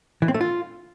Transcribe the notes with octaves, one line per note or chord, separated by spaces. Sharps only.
E3
C4
A3
F4